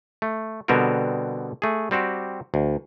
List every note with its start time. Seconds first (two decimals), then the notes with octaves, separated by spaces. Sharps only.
0.22 A3
0.68 B2 D3 G3 B3 C4 A#4
1.62 A3 G#4
1.91 G3 C4 F#4 G4
2.54 D2